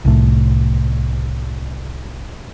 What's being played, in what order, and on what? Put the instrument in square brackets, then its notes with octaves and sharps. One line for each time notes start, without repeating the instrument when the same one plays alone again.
[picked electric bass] C2 A2